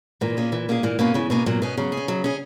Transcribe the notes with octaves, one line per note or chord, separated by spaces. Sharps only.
A#2 E3
A#3 C#4 G#4
E3
A#3 C#4 G#4
A#2 E3
B2 A#3 C#4 G#4
C#3 E3
B2 A#3 C#4 G#4
A#2 F#3
B2 C#4 G#4
C#3 F#3
G#4
C#4
F#3
C#4 G#4